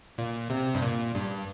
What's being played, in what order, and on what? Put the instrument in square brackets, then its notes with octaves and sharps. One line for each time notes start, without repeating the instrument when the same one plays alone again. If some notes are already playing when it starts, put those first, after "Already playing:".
[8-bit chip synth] A#2
C3
G2
A#2
G2